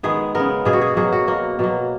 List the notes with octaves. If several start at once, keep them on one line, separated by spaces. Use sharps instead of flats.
D#3 G#3 B3 G#4
C#3 G#3 B3 A#4
B2 A#3 G#4
F#4
G#4
B2 F#3 A#3 G#4
F#4
B2 A#3
B2 F#3 A#3